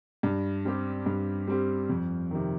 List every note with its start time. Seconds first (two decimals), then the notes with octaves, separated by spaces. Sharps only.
0.23 G2
0.65 G3 C4 G4
1.06 G2
1.47 G3 C4 G4
1.89 F2
2.31 C3 D#3